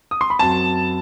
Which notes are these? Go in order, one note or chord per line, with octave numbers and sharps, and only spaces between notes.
D#6
C6
B5
F#2 F#3 C4 A5